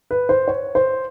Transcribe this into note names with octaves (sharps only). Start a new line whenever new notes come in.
B4
C5
C#5
C5